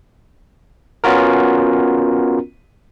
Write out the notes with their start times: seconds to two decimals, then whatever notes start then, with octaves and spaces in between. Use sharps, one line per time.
1.04 B3 C#4 F4 F#4 A#4